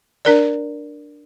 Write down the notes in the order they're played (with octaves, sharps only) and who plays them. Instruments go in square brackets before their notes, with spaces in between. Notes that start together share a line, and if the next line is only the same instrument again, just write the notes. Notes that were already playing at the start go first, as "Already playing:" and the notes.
[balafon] D4 A#4 D5